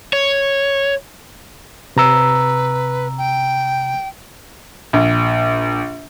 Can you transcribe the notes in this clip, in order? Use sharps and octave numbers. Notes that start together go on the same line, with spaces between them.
C#5
C3 B4 A#5 E6
G5
A#1